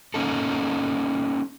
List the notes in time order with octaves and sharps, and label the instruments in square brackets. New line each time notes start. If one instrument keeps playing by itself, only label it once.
[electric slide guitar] A#3 C#4 D#4 A4